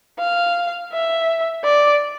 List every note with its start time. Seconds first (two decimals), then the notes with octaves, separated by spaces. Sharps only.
0.19 F5
0.93 E5
1.64 D5